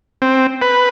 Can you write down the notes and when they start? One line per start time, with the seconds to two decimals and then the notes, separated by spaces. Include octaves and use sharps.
0.22 C4
0.62 B4